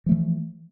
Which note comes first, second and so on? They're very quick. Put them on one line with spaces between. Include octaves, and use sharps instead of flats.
F3 A3 E3